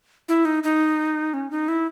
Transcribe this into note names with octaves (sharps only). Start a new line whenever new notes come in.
E4
D#4
D#4
C#4
D#4
E4